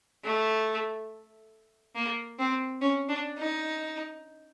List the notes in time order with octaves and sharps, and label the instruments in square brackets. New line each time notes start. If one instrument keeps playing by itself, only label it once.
[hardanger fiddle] A3
A#3
C4
C#4
D4
D#4